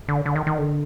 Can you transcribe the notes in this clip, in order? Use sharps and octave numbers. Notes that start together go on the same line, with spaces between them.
D3
D3
D#3
D#3
D3